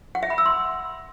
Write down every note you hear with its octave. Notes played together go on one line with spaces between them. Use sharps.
F#5
E5
B5
E6
C6